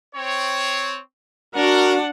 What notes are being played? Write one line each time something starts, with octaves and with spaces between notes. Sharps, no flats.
C4 C#5
D4 F#4 A#4 F#5